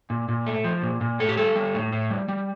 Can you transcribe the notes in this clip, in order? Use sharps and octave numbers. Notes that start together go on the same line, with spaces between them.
A#2
A#2
A3
F3
A#2
A#2
A2 A4
G4
G3 A4
G3
A2
A2
G3
G3